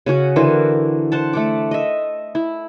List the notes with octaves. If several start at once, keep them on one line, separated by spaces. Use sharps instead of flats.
C#3 C#4 F#4 F#5
D3 E3 A#4 C5
C5 F#5 A5
A3 F#5 D6
D#5 E5
E4